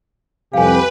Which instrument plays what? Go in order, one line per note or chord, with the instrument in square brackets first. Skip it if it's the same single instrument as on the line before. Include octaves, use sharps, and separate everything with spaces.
[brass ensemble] C2 F2 [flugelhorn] G4 [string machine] B4 [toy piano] F5 G#5